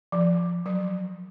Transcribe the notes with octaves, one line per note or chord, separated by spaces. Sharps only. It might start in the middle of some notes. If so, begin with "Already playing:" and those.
F3
F#3